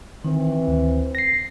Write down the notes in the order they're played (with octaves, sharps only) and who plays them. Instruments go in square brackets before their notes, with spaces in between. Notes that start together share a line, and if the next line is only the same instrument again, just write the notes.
[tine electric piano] D#3 [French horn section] E3 C4
[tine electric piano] D2
A#6 C7